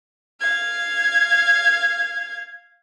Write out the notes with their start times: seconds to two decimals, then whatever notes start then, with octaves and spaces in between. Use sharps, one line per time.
0.41 F5 G#6